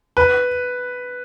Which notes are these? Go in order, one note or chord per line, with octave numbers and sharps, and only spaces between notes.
B4